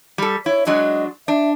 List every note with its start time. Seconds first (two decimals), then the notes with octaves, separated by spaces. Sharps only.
0.18 G3 A4
0.46 E4 C#5
0.67 F#3 G#3 D4 D#5
1.28 D4 E5